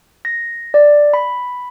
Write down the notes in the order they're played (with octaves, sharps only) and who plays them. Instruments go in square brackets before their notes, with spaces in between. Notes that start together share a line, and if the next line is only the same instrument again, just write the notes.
[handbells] A#6
D5
B5